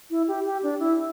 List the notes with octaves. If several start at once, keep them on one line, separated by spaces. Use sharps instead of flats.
E4
G4
G4
D4
E4